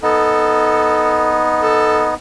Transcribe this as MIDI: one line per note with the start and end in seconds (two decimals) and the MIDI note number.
0.03 2.14 59
0.03 2.14 63
0.03 1.45 69
1.62 2.08 69